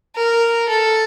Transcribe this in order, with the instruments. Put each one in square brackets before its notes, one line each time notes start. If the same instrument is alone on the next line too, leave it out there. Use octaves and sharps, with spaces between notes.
[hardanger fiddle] A#4
A4